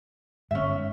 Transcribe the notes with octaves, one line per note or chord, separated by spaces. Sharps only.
G1 G#2 C#4 E5